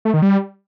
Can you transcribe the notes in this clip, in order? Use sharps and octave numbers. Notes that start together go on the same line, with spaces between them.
A3
D#3
G3